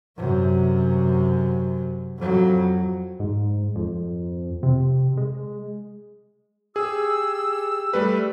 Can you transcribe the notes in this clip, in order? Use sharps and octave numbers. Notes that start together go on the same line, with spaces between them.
F#2 C3
F2 F#3
G#2
F2
C3
G#3
G4 G#4 E6
G3 A3 B4